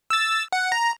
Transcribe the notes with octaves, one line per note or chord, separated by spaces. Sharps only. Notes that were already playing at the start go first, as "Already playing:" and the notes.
E6 A6
F#5
A#5